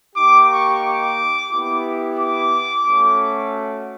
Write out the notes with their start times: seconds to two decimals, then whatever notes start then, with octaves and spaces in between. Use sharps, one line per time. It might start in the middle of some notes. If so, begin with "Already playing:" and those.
0.16 A#3 D#4 G4 D6
0.49 C#6
0.82 D6
1.50 B3 E4 G4
2.18 D6
2.86 A3 C#4 F#4